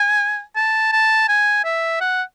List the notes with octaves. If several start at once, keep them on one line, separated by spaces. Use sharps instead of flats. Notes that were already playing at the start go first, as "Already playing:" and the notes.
Already playing: G#5
A5
A5
G#5
E5
F#5